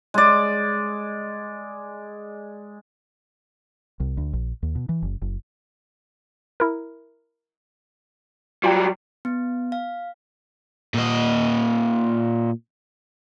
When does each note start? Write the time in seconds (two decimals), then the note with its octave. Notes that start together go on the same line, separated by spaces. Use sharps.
0.14 G#3 D5
4.00 C2
4.17 D2
4.33 A#1
4.63 D#2
4.76 B2
4.89 E3
5.02 F#1
5.22 F#1
6.60 E4 A#4
8.63 F#3 G3 F4 G5
9.25 B3
9.72 F5
10.94 A#2 D#5